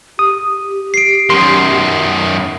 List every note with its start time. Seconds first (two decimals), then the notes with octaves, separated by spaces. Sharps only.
0.19 G4 D#6
0.94 C7 D7
1.30 F#2 D#3 C6